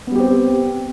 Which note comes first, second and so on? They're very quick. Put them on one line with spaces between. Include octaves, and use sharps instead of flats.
B3 G3 G4 C4